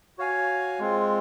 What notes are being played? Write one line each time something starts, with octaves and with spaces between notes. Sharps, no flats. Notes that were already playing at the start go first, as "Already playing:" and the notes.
F#4 C#5 F5 G#5
G#3 C4 F4